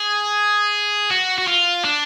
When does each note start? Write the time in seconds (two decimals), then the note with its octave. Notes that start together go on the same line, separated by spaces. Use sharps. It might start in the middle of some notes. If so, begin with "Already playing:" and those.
Already playing: G#4
1.10 F#4
1.38 F#4
1.47 F4
1.85 D4